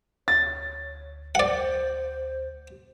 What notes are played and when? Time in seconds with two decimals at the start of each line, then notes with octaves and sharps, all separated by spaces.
0.28 D2 C#5 A6
1.35 C5 D5 F#5